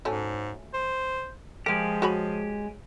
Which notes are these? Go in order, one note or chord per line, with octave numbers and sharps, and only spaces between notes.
G#2 F#3 A3 C#4
C5
F3 G#3 G4 A#4 F5
F#4 C#5 B5